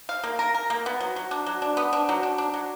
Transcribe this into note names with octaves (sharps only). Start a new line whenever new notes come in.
F5
A#3
A#4
A#4
A#3
B3
F#3
F#3
D4
F#3
D4
B3
D4
F#3
D4
D4
F#3